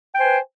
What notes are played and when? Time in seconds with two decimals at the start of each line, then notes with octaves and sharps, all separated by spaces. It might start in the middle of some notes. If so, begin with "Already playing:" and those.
0.13 G5
0.17 C5
0.20 G#5
0.24 B4